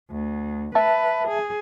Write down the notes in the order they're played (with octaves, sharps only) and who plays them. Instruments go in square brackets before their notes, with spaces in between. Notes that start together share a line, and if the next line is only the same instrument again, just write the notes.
[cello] D2
[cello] B4 [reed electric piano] E5 A5
[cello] G#4